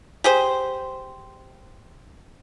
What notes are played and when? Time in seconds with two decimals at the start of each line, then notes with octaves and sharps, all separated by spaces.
0.24 G4 G#4 C5